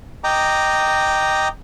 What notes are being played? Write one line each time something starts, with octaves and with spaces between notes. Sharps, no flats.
D#5 G5 A#5 D6